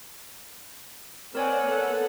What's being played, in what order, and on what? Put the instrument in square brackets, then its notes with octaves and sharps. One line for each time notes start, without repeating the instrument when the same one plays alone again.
[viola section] C4 D5 F#5 [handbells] A#4 C#5 G#5
[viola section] B3 A4 F#5